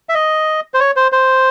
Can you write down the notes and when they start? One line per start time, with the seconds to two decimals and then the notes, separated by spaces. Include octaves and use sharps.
0.09 E5
0.15 D#5
0.74 C5
0.80 C#5
0.96 C5
1.12 C5